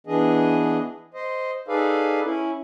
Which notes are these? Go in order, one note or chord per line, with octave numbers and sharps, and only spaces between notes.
E3 B3 D4 G#4 D#5
C5 D#5
D#4 G#4 A4 B4 D5 F5
C#4 E4